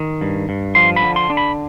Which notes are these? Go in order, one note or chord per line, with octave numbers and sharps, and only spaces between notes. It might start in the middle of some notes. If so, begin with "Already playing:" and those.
Already playing: D#3
G2
G2
F3 C6
B5
D3
C6
D4
B5